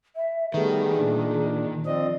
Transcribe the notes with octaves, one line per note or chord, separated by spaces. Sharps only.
E5
D#3 G3 A3 B3 G#4
A#2 D4
F3 C4 D5 D#5